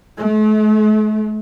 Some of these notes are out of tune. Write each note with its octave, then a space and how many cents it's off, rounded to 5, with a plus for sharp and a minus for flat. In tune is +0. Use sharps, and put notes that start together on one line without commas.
A3 -45